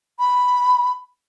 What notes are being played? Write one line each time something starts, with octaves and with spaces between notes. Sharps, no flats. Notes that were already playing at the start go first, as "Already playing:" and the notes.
B5